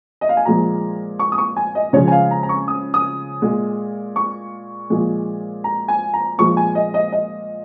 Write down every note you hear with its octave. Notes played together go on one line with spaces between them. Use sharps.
D#5
F5
G#5
A#2 F3 G#3 A#5
C#6
D#6
C#6
G#5
D#5
C#3 F3 G#3 C#5
G#5
F5
A#5
A#5
C#6
D#6
D#6
A#2 G#3
C#6
A#2 F3 G#3
A#5
G#5
A#5
A#2 F3 G#3 C#6
G#5
D#5
D#5
D#5